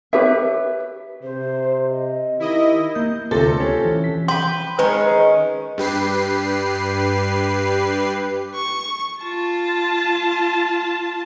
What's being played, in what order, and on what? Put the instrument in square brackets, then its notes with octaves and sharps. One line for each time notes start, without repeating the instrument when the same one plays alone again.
[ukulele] G4 B4 C#5 E5
[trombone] C3 [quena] C5
[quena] D#5
[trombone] D#3 [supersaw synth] E4 D#5 [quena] G4
[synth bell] A#3 G6
[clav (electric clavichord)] D2 C3 [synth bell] F4 G4 [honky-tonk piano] A4 A6
[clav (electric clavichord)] C4 C#4
[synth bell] E3
B6
[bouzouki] B4 G5 [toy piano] C6
[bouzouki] D#3 G#3 C#4 [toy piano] B4
[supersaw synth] G2 G4 B4 C7
[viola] C#6
F4 A5